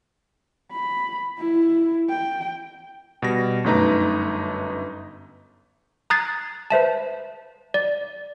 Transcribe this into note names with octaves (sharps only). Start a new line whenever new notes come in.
B5
E4
G5
B2 G3 A#6
G1 F#2 A3 D#4 B4 A#5
A#5 D#6 F#6 G#6 A6 C7
B4 C5 E5 A5
D5